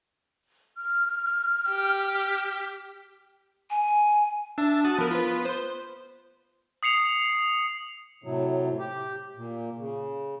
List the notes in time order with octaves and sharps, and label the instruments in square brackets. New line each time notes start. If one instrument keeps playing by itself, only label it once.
[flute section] F6
[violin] G4
[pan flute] G#5
[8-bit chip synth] D4 [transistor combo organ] E5 A5
[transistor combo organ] F#4 A5 D#6
[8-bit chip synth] F3 A#4 [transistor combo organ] B3
[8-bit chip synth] F4 B4
C5 C6
[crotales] D#6 C7 C#7 F7
[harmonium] A2 C3 F#3
G4
A#2
C#3